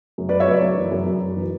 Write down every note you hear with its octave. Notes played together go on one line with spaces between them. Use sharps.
F#2
F#2 B4 D5
C#5 E5
F#2 B4 D5
F#2
E3
F#2
F#2
F#2
E3